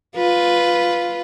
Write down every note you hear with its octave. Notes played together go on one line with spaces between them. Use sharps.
F4 B4